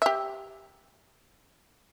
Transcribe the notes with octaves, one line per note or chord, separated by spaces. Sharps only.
G4 E5